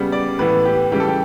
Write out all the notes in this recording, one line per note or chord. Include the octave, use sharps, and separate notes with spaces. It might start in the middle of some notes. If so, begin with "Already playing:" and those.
Already playing: C#3 G3 B3
D5
A2 E3 B3 B4
G4
C#3 E3 G3 G4
A4
G4